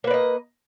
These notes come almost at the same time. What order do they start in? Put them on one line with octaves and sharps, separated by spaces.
A#3 B4 D5 D#5